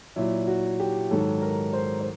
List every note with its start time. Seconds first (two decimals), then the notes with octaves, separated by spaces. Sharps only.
0.16 A#2 F#3 E4
0.47 F#4
0.80 G4
1.11 G#2 D#3 F#3 A4
1.42 A#4
1.73 C5
2.01 C5